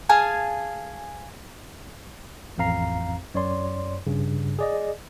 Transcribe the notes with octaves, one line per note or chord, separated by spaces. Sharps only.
G#4 F5 G#5 A5
A1 F2 C4 F5 A#5 C7
F#2 C#5 D5 C6
G2 C#3
G#4 D5 D#5